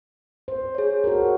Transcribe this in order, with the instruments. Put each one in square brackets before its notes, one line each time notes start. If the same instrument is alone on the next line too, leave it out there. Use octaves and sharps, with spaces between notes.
[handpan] C5
[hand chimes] G#4 C#5
[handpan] F#4 A4 A#4